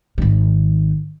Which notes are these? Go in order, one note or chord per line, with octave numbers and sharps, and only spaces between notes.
G#1 D#3